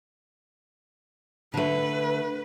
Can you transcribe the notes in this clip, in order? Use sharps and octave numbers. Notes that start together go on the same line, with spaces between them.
D3 A3 B4